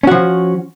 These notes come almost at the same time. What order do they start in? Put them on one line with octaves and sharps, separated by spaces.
C#4 F#4 F3